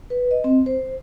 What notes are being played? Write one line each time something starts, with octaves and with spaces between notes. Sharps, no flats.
B4
D#5
C4
C5